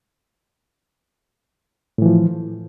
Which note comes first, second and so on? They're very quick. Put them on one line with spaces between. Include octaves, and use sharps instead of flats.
A2 E3 F3